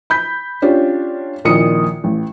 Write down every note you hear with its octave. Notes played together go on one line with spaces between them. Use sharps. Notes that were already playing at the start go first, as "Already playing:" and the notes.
B5 G6 B6
C#4 D4 F4 G4 C#5
A#1 A#2 D#3 E4 D#6 C#7
A1